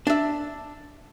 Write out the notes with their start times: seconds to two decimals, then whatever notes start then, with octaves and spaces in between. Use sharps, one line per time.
0.07 D4 E5